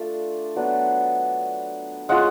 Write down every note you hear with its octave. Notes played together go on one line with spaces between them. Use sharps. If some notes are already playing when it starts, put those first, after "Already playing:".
Already playing: A3 D4 F4
F#3 B3 D4
G#3 C#4 F4 F#5